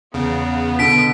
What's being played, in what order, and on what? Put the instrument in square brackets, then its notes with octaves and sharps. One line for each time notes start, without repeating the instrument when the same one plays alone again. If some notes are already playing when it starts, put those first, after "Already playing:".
[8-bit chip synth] E2 C#3 [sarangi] B3
[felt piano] B2 D3 [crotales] B6 D7